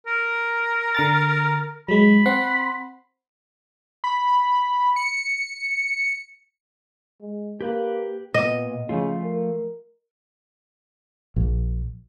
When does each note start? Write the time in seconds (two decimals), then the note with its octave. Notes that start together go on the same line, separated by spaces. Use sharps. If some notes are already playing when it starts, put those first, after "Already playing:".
0.07 A#4
0.95 D3 A#5 A6
1.88 F#3 G#3 B5
2.26 C4 F#5 C6
4.04 B5
4.96 C#7
7.21 G#3
7.61 A#3 G4 B4
8.34 A#2 B3 D#5
8.89 C#3 F3 A3 F4
9.24 A#4
11.36 A#1